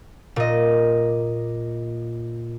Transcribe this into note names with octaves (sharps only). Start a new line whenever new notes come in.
A#2 D#5